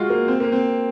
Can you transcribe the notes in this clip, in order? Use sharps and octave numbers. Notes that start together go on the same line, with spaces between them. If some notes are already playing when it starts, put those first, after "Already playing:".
Already playing: G#3 F4 F#4
A#3
C4
A#3
C4